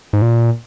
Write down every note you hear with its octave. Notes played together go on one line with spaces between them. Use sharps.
G#2
A#2